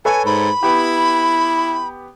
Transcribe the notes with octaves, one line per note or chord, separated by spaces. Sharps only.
A4 B4 C#5 G#5
G#2 B5
B3 E4 G4